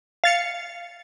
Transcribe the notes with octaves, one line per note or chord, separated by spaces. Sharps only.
F5 A6 C#7